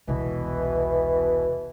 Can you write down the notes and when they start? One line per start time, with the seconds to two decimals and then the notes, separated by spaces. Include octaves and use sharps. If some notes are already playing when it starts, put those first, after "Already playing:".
0.08 E1 C2 B2 E3